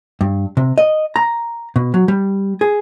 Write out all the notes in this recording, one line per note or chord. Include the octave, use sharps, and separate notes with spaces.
G2
C3
D#5
A#5
B2
F#3
G3
G#4